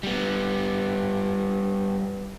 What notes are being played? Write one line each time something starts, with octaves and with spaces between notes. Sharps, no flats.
G3 B3